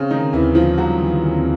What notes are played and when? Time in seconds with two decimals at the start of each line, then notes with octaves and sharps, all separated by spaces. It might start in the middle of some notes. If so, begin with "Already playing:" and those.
Already playing: C#3 C4 C#4
0.10 D3 D#3 D#4
0.33 D#2 E3 E4
0.55 D3 F3 F4
0.78 F#3 G3 F#4
0.99 D#2
1.21 G3